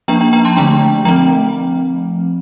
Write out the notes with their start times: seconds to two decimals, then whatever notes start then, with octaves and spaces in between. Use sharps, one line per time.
0.08 F3 A#3 D4 G5 A#5
0.21 G5 A#5
0.33 G5 A#5
0.45 A5 C6
0.57 D3 A3 D4 G5 A#5
1.05 F3 A3 C4 G5 A#5